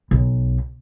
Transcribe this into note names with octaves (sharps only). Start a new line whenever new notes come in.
B1